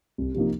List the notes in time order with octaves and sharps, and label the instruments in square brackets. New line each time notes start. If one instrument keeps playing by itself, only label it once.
[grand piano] C2
C3 F3 A#3 D#4